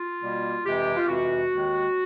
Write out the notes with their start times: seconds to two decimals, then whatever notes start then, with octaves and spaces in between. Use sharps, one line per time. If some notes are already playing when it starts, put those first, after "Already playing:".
Already playing: F4
0.21 B2 G3 A#3
0.64 F2 C3 E3 G#3 G4
0.96 F4
1.07 F2 C3 E3 G#3 F#4
1.51 D#2 D#3 G#3